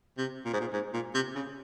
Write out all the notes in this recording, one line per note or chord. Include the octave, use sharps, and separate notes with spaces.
C3
A#2
G#2
A#2
G#2
A#2
C3
C#3